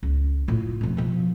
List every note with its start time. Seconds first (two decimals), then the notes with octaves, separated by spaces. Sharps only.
0.03 C#2
0.48 A2 F4
0.81 B1 F2
0.97 B2 F3